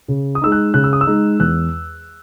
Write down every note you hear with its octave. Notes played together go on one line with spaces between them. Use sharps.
C#3
D#6
G#3 D#4 E6
F#6
C#3 F#6
E6
D#6
E6
G#3 D#4
E2 F#6